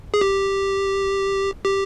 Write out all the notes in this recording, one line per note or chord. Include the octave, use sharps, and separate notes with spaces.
G#4
G4
G4